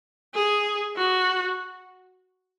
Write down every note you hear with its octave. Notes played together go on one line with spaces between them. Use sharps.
G#4
F#4